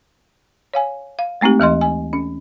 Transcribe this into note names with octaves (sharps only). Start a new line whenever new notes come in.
C#5 F5 G#5
F5
G#3 A3 C4 D#4 G4
D#2 E3 D#5 C6
G#5
C#4